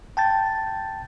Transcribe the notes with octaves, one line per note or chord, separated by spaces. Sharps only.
G5 A5 G6 A6